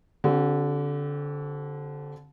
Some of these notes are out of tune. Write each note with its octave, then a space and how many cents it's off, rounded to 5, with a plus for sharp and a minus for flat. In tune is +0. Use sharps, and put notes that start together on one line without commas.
D3 -25 C4 +0 F#4 +45